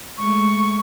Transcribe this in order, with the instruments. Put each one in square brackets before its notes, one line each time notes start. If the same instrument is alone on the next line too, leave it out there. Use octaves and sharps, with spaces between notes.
[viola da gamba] G#3 A3 [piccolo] C#6